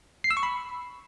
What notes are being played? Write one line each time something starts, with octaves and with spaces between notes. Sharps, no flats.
C7
E6
C#6
B5